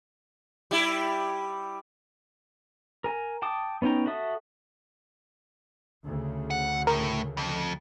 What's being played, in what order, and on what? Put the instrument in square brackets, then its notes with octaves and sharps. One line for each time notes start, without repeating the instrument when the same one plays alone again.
[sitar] G3 E4
[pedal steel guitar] A#4 G#5
G5 A5 D6 D#6
B3 C#4 D#4 G5 A#5
F#4 A4 E5 D#6
[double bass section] D2 C#3
[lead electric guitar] F#5
[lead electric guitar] A2 [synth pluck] A#4
[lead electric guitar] F2